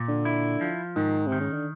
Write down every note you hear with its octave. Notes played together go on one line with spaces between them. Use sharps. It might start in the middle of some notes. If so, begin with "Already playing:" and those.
Already playing: A#2
D3
E4
F3
G#2 D#3
C3
D#3
C#3
D3